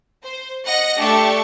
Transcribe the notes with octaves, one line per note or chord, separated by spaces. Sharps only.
C5
D#5 F#5 A#6 C#7
A3 D4 G4 A4 A5 C#6